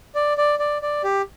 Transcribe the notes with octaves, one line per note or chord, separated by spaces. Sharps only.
D5
D5
D5
D5
G4